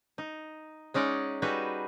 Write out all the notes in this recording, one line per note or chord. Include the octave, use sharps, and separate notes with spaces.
D#4
G#3 C#4 D#4 D5 F#5
G3 D#4 F#4 G#4 B4